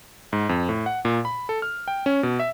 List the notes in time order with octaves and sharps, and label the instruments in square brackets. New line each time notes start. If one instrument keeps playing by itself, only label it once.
[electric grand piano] G#2
F2
A2
F#5
A#2
B5
A4
F6
G5
C#4
B2
E5